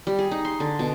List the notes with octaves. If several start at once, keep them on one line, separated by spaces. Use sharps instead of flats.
G3
G#4
D#4
C6
D3
B2